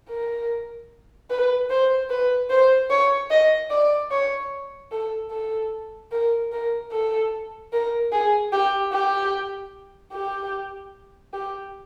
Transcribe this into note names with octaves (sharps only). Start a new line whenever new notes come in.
A#4
B4
C5
B4
C5
C#5
D#5
D5
C#5
A4
A4
A#4
A#4
A4
A#4
G#4
G4
G4
G4
G4